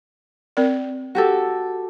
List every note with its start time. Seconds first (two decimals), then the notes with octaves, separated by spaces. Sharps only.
0.57 C4 A#4 D5
1.15 F#4 G4 A4